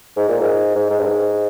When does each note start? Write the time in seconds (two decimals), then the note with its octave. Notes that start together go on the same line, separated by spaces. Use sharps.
0.16 G#2
0.28 A#2
0.41 G#2
0.76 G#2
0.90 G#2
1.00 G2
1.05 G#2